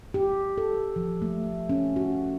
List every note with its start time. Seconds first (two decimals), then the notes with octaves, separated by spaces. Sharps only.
0.14 G4
0.58 A4
0.96 F3
1.22 A3
1.69 C#4
1.96 F#4